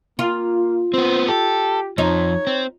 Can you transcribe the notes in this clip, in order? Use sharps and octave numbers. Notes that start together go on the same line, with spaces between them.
A#3 F4
B3 C4 C5
G4 A4
F2 F3 D#4 C#5
C4